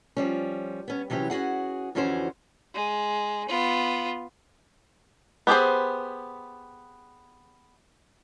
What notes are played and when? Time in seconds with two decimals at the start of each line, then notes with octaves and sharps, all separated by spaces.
0.17 F3 G3 C#4
0.88 B3 C#4
1.10 C3 E3 F#3 C#4 G4
1.30 C#4 F#4 G#4 F#5
1.95 F2 D3 E3 C#4 F#4 C5
2.74 G#3
3.49 B3 F4
5.47 B3 G4 G#4 C5